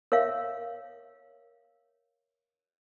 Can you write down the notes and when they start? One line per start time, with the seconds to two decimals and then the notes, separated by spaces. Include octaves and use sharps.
0.12 A#4 C#5 E5 F5